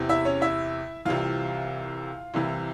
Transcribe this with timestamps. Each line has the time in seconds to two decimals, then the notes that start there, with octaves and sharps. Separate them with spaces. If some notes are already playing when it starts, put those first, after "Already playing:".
Already playing: E2 C3 E3
0.09 E4 E5
0.25 C#4 C#5
0.41 E4 E5
1.05 C2 C3 E3 F4 F5
2.34 C2 C3 E3